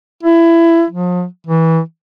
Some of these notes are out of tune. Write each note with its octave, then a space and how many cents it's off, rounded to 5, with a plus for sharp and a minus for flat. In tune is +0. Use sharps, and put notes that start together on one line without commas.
E4 +20
F3 +40
E3 -20